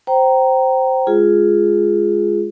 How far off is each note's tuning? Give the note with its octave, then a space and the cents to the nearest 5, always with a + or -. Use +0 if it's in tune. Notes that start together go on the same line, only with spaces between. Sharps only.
C5 +0 G5 -20 A#5 +0
G#3 +5 F4 +0 G#4 +0